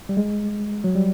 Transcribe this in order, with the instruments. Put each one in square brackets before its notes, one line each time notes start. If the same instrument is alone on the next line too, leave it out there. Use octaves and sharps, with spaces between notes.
[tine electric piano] G3
G#3
F#3
G3